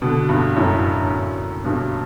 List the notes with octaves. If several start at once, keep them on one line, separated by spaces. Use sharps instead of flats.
B2 D3
G2 B2
F#2 A2
G2 B2